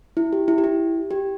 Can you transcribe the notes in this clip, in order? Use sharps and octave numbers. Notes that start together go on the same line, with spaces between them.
E4
G4
E4
G4
E4
G4